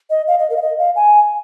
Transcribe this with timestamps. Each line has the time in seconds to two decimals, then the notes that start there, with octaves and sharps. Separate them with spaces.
0.10 D#5
0.27 F5
0.39 D#5
0.50 A#4
0.56 F5
0.62 D#5
0.79 F5
0.96 G#5